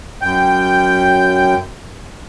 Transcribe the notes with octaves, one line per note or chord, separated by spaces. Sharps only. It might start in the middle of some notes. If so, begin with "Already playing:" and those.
F#2 G5 G6